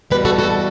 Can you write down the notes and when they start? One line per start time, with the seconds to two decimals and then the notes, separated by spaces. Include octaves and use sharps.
0.10 E2 B2 G3 G4 B4
0.25 F#4 A4
0.38 F#4 A4